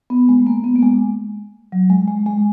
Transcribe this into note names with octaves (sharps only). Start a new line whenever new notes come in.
B3
G#3
A#3
B3
A#3
G#3
F#3
G#3
G#3
G#3